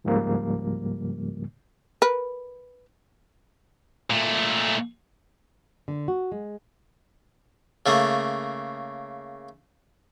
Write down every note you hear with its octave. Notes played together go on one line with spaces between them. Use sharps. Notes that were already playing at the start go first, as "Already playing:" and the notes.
C#2 G#2 C#3 F3 G3 A#3
A#4 B4
A#2 A3
D3
F#4
G#3
C#3 A3 A#3